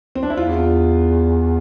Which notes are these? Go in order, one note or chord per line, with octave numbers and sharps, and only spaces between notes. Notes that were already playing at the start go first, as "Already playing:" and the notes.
C4
D4
E4
E2 F4